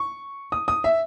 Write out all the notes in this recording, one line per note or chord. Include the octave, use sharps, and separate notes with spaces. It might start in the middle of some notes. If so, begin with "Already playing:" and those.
Already playing: C#6
D#6
D#6
E5